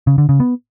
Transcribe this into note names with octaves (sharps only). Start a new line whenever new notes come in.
C#3
D3
C#3
B3